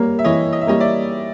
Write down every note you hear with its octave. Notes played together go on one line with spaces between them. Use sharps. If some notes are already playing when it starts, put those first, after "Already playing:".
Already playing: G3 A#3 C#5
E5
E3 C#5 D#5
D#5
E5
G3 A#3 C#5 D#5
D5 E5